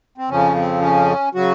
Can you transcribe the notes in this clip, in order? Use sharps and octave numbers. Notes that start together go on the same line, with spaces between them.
C4
F2 C#3 F3 C#4
C4
C#4
C#3 F#3 F#4